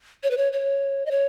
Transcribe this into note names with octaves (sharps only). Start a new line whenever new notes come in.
C#5
B4
C#5
C#5
D#5
C#5